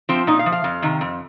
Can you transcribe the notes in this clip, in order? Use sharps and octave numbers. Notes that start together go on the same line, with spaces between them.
F3 C4
A#2 D#4
F5
F3
F5
F2
C3 D#3
F2